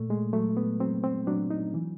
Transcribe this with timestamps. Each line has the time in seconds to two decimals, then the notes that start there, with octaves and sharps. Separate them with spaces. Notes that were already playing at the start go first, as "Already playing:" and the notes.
Already playing: A#2 A3
0.10 G#3
0.33 F#3 A3
0.57 B3
0.80 F#3 C4
1.04 C4
1.27 F#3 D4
1.50 D#4
1.74 E3